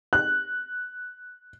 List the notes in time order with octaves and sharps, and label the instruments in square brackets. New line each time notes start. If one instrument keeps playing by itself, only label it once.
[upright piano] F#6